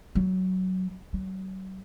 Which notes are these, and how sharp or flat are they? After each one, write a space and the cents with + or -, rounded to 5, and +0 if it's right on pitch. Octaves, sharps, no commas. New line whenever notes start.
F#3 +10
F#3 +40